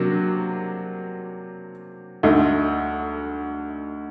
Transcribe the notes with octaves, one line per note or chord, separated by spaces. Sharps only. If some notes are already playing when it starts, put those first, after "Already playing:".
Already playing: C3 F#3 A#3 D4 F#4
D2 D3 A3 D#4